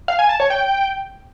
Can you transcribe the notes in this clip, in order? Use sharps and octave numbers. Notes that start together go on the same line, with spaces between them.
F5
G#5
A5
C#5
G5